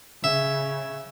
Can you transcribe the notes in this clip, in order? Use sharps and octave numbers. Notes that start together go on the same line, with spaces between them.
C#3 E5